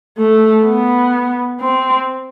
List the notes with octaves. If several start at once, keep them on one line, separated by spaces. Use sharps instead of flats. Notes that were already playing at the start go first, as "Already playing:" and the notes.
A3
B3
C4